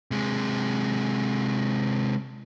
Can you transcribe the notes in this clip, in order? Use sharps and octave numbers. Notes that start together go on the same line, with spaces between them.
C3 G#3